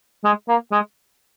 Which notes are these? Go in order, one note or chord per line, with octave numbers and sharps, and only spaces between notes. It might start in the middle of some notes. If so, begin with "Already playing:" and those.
G#3
A#3
G#3